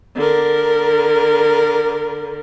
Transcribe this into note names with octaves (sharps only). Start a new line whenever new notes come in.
D3 A#4